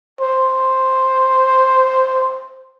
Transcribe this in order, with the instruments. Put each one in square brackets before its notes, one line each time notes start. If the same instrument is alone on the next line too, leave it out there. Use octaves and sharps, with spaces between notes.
[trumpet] C5